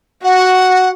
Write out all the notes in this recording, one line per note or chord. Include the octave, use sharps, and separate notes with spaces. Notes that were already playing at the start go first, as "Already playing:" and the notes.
F#4 F#5